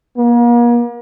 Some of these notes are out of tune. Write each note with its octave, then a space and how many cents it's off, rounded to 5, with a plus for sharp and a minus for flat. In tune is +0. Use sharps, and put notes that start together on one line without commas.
A#3 +40